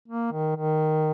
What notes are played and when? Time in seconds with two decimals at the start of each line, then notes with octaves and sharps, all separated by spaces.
0.08 A#3
0.32 D#3
0.56 D#3